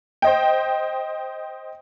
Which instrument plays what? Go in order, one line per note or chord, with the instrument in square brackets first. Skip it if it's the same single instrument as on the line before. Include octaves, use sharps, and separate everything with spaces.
[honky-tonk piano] C5 D#5 G5